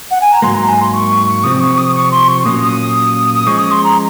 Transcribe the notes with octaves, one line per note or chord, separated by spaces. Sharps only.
F#5
G#5
A#5
G#2 F#3 A#3 C6
A#5
G#5
C6
C#6
C3 F3 C4 D#6
C#6
D#6
C#6
C6
C#6
A#2 F#3 A#3 C#4 D#6
D#6
D#6
F3 G#3 C#4 C#6
D#6
C6
A#5